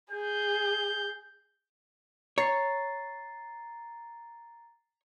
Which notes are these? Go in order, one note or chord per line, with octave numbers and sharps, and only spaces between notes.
G#4 G6
C#5 A#5 A6 C7